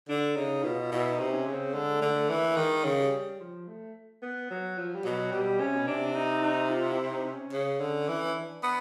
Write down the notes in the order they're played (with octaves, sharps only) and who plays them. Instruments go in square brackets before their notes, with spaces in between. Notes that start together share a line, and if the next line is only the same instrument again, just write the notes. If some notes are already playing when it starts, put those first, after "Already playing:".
[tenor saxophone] D3 [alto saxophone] D4
[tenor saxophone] C#3 [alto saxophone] D#4
[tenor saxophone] B2 [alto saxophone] F4
[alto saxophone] F4
[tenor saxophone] B2 [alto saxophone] E4
[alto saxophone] D#4
[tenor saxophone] C3
[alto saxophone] C#4
[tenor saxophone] C#3
[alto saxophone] C4
[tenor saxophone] D3 [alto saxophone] G#3
[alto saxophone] A3
[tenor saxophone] D3
[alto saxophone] A3
[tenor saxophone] E3
[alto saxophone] A#3
[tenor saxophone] D#3 [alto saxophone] G#3
[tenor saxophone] C#3
[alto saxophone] G3
F3
A3
B3
F#3
F3
G3
[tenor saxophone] B2 [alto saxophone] F#3
[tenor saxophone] B2 [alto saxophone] G3
[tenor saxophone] C3 [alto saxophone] C#4
[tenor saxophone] B2
[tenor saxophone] C3 [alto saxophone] D4
[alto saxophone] D4
D#4
D#4
F4
E4
D#4
C4
C#4
[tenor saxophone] C#3
D3
E3
[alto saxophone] C#4
D4
[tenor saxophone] B3